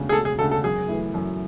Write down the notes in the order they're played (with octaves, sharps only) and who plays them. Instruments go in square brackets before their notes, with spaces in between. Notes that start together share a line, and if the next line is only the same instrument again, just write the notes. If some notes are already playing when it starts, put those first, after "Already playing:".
Already playing: [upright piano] E1 D2 C#3
[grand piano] G#4
[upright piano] E1 [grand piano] A4
[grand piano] G#4
[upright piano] D2 C#3 [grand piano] A4
[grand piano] A4
[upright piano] F#2 [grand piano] G#4
[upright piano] E3 A3 E4
F#2